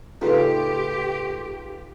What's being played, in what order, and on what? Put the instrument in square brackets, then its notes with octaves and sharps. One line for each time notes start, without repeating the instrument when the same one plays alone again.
[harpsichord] A2 C#3 [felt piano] D#4 F4 B4 [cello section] G4 [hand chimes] A4 C6